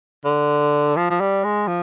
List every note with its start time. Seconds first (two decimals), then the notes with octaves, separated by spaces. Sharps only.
0.25 D3
0.96 F3
1.10 F3
1.20 G3
1.44 G#3
1.68 F3